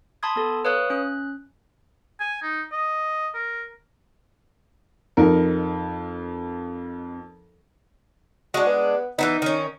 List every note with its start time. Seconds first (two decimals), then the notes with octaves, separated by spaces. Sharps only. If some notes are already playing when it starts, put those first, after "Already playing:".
0.23 A5 B5 C6 D#6 G#6
0.36 B3 A4
0.65 B4 C#5 F5 D#6 F#6
0.90 C#4 F#6
2.20 G#5
2.42 D#4
2.72 D#5
3.34 A#4
5.17 F2 D#4 A#4
8.54 G#3 D4 F#4
8.67 B3
9.19 E3 F#3 B3 D#4
9.42 D#3 C#4